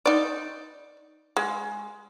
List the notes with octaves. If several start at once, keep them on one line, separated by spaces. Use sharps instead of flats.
D#4 D5
G#3